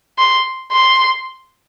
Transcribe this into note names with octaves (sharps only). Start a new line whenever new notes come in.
C6
C6